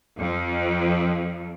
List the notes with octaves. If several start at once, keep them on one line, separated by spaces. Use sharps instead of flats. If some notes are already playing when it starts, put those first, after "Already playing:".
F2